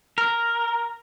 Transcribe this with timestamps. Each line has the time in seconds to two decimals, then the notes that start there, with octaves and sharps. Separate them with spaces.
0.18 A#4